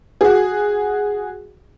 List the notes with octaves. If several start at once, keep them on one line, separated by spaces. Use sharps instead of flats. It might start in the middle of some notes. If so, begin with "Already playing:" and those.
F#4 G#4